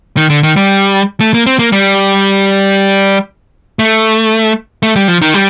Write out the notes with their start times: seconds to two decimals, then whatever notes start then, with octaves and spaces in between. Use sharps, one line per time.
0.17 D#3
0.30 D3
0.43 D#3
0.56 G3
1.21 A3
1.34 A#3
1.46 C4
1.59 A#3
1.72 G3
3.79 A3
4.83 A3
4.96 G3
5.08 F3
5.22 D#3
5.34 G3